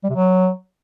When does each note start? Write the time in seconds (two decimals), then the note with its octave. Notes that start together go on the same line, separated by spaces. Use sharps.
0.04 G3
0.09 C3
0.15 F#3